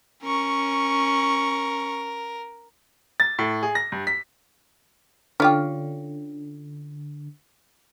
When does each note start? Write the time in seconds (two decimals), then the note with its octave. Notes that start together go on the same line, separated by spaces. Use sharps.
0.23 C#4 A#4 C#6
3.20 A6
3.39 A2
3.63 G#4
3.75 A#6
3.92 G2
4.07 B6
5.40 D3 C#4 F4 G4